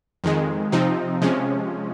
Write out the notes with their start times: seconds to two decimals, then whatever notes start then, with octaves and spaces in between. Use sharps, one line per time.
0.24 F2 D#3 G#3
0.72 C3 F3 C4 D#4
1.21 C3 F3 G#3 C#4